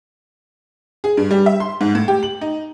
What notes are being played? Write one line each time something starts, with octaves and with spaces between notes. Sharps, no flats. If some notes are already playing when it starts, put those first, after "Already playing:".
G#4
G2
G3
E5
C6
G#2
A2
G4
F#7
D#4